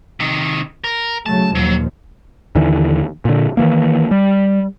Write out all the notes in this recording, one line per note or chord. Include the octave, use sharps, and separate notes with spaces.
C3 D#3
A#4
C#3 F#3 A3 A5
D#2 A#2 F3 F#3
D#2 D3 E3
A#2 D3
D#3 E3 A#3
G3